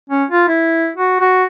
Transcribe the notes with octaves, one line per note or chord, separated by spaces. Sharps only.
C#4
F4
E4
F#4
F#4